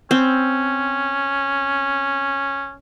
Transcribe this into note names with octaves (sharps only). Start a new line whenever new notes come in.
C4 C#4